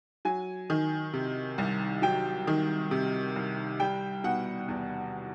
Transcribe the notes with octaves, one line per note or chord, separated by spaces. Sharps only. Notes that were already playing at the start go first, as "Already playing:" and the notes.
F#3 G#5
D#3
C3
C2
F#3 G5
D#3
C3
C2
G3 G5
B2 F#5
E2